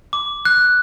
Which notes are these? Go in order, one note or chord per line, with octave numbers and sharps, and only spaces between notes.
D6
F#6